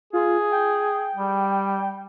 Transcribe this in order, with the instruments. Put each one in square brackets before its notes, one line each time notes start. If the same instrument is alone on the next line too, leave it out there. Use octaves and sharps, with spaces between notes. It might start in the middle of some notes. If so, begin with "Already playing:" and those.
[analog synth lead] F4 [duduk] G#4
[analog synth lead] G5
[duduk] G3